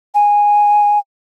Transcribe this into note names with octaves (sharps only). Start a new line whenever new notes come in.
G#5